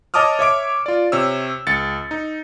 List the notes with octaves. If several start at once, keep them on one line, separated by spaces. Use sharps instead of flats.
C#5 D#5 A5 D6 D#6 F6
C#5 E5 D6 D7
F4 D5
C3 C#5 E6
C#2 A6 C#7
D#4